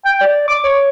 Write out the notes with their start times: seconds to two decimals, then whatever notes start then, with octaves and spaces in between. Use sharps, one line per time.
0.05 G5
0.21 D5
0.48 D6
0.64 C#5